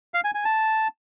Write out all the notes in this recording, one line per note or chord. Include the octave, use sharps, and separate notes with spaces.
F5
G#5
G#5
A5